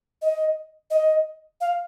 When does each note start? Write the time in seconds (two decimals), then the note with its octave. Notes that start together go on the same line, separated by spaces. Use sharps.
0.22 D#5
0.91 D#5
1.61 F5